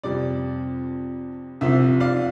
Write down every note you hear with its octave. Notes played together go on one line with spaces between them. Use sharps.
F2 C3 G3 D5
C2 C3 F3 E5
D5 F5